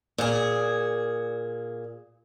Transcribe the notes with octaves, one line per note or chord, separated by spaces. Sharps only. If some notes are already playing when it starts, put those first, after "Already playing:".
A#2 G#4